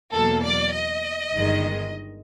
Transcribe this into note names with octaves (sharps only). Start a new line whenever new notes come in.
E2 B2 F#3 A#3 A4
D5
D#5
G1 G2 D#3 G#3